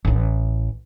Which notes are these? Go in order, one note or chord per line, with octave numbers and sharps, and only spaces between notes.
A1 E4